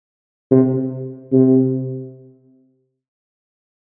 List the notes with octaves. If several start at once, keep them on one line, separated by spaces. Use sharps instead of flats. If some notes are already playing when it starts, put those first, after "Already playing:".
C3
C3